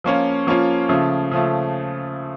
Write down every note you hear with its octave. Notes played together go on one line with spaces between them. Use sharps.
F3 A#3 C#4 F4
F3 A#3 C#4 F4
C#3 F3 A3
C#3 F3 A3